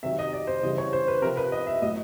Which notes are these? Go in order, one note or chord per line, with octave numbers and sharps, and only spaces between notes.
C3 D#3 F#3 E5
D#5
D5
C5
C#3 E3 G3 D#5
C#5
C5
B4
C3 F3 A#4
B4
D#5
E5
A2 F#3 D#5